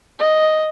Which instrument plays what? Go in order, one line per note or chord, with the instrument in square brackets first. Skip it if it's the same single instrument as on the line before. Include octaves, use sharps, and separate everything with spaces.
[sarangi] D#5